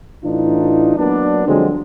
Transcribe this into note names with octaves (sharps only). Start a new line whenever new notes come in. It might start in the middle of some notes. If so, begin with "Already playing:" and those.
A2 E3 D4 D#4 F4
F#3 A#3 B3 D4
D3 F3 F#3 G#3 C4